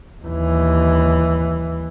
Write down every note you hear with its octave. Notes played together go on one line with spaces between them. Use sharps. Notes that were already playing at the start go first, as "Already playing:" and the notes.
D#2 E3